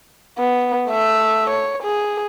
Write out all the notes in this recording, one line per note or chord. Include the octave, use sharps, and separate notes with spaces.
B3
A3 E5
C#5
G#4